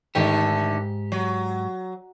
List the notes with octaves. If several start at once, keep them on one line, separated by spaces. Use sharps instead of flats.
G#2 D3 D#3 A3 G4
F#3